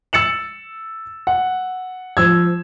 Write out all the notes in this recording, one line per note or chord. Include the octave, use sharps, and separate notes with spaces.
E6 A6 C#7 E7 F#7
F#5
F3 E6 G#6